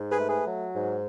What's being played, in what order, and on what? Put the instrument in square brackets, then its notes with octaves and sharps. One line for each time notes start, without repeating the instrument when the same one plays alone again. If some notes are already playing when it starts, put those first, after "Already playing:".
Already playing: [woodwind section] G#2
G#4 B4
A3
G#4 B4
F#3
G#2